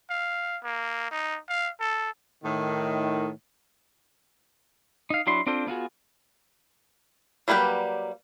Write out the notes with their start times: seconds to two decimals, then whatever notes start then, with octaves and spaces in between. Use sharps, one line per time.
0.10 F5
0.63 A#3
1.11 D#4
1.49 F5
1.80 A4
2.44 A2 D#3
5.10 D#4 F5
5.27 F#3 D4 E4 F#4 C6
5.47 C4 D4 F4 A4 C5
5.67 B3 F4 F#4 G#4
7.48 F#3 G3 A#3 G4 B4